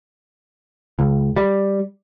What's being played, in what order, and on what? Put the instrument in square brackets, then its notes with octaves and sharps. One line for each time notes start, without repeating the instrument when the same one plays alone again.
[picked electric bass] C#2
G3